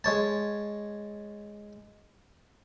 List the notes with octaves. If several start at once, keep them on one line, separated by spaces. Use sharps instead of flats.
G#3 C#5 A5